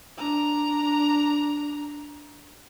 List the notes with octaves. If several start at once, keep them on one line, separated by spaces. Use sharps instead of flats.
D4 A#5